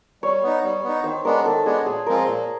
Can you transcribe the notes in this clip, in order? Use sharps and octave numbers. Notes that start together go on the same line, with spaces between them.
G3 C#5
B3 D#4
G3
B3 D#4
D#3 C5
G#3 B3 D4 A#4
D#3 A4
G#3 B3 D4 G#4
A#2 G#4
F3 G#3 C4 F4 A#4
A#2